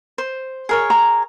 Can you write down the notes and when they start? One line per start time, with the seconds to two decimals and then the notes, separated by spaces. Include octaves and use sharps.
0.18 C5
0.69 G#4 A#4 C#5
0.90 A#5